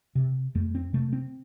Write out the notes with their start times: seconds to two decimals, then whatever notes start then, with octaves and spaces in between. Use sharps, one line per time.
0.15 C3
0.55 F2 A3
0.75 C4
0.93 C3 A3
1.13 C4